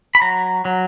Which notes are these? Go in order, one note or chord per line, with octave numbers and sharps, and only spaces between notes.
B5
F#3 A#5
F#3